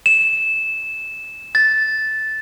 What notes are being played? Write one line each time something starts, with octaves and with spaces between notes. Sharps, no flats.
E7
A6